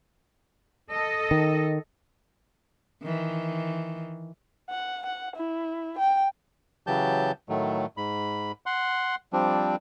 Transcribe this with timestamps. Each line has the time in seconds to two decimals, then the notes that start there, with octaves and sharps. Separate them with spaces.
0.91 A4 D#5
1.31 D#3
3.03 D#3 E3
4.70 F#5
5.06 F#5
5.36 E4
5.98 G5
6.87 C#3 E3 F#3 G4 A5 G6
7.49 A2 D#3 F#3 A3
7.97 G#2 B5
8.66 F#5 C6
9.33 F3 G3 C4 D4